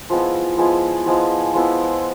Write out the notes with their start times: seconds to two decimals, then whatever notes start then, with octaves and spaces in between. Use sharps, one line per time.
0.10 F3 G#3 B3 E4
0.58 F3 G#3 B3 E4
1.06 F3 G#3 B3 E4
1.54 F3 G#3 B3 E4